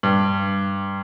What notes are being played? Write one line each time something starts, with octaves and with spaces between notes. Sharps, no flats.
G2